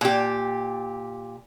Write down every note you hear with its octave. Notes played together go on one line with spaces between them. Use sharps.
A#2 G4